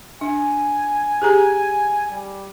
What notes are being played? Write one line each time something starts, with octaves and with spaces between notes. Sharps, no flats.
D4 G#5
G4 G#4 A#5
G3